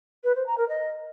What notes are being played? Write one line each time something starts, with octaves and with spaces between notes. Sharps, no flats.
B4
C5
A#5
A#4
D#5